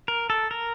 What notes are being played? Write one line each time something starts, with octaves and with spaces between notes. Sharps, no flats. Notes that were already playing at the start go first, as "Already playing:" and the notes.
A#4
A4
A#4